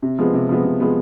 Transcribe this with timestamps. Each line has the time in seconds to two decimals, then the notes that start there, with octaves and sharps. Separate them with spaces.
0.02 C3
0.19 F3 G#3 B3
0.34 C3
0.49 F3 G#3 B3
0.65 C3
0.80 F3 G#3 B3